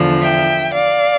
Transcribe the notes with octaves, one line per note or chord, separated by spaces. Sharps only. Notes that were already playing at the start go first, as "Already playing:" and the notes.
Already playing: E2 D3 F3
E5 G5
D5 F5